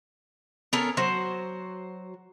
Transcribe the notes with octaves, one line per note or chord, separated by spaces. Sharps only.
B3 C#4 A4 A#4
F#3 F#4 C5